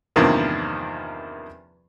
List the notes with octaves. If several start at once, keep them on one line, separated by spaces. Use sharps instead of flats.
E2 G2 C3 D#3 F3 A#3